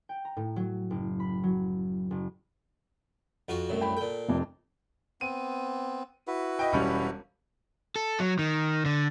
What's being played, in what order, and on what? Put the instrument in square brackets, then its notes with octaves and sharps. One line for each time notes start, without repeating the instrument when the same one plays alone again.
[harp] G5
A#5
A2
F#3
F#1
B5
F#3
F#1
[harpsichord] F2 F4 F#4
C2 F#2 A2
[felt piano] G5 B5
[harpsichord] A#2 G5 [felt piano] A4
[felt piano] F1 F2
[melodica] B3 C4 [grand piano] D#7
[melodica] E4 F#4 B4
[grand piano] D#5 G5
E1 G3 C#4
[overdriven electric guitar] A4
F#3
D#3
D3